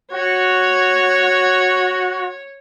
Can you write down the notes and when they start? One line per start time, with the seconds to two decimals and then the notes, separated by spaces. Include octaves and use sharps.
0.12 F#4 C#5